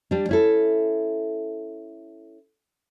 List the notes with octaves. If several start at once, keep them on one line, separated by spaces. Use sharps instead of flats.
G3 D4
C#4 E4 A4